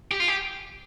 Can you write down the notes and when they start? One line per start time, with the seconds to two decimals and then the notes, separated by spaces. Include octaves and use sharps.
0.11 G4
0.20 F4
0.28 G4